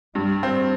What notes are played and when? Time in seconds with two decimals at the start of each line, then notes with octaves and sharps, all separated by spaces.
0.15 G2 G3
0.43 C4